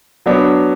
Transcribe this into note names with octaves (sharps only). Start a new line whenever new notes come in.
F#3 B3 D4